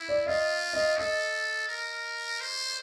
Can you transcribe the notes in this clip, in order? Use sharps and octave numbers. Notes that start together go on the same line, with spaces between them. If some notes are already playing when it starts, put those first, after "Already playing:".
Already playing: E4
D5
F4 D#5
D#5
A4 D#5
A#4
C5